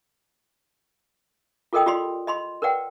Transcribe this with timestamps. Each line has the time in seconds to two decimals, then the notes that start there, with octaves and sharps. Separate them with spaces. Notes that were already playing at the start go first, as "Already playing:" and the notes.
1.73 F4 A4 A#4 D#5 G5 D#6
1.86 F4 G4 D5 B5 C6
2.27 D#5 B5 C6
2.62 A#4 B4 D5 F#5 G5